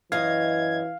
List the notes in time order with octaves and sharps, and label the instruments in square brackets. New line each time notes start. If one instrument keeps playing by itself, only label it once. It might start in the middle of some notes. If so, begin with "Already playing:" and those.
[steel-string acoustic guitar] F#2 D#5 [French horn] E3 [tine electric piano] F5 [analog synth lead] G#6